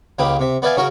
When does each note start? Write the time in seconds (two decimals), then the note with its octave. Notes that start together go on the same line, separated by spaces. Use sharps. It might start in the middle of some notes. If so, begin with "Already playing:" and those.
0.19 C#2 A#3 G4 B4 D#6
0.39 C3 E5
0.62 B3 B4 D5 E5 F5 G#5
0.77 C#3 C#4 F#4 A#4